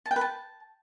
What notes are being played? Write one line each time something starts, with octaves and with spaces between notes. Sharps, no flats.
A5
G5
B4
A5